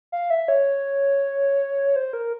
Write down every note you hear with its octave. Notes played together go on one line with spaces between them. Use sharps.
F5
E5
C#5
C5
A#4